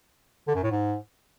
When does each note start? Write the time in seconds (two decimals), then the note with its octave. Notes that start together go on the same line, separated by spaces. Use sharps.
0.47 D3
0.55 F#2
0.63 A2
0.71 G#2